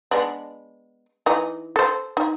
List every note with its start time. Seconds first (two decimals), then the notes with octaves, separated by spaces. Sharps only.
0.11 G#3 B3 D4
1.26 E3 D#4
1.76 A4 C5
2.17 D#4